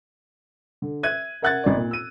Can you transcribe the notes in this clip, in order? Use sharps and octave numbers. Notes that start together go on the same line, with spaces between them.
D3
E5 F#6 G#6 D#7
A#4 E5 F#5 F#6 G#6 A6
G#1 D5
A#2
E6 D#7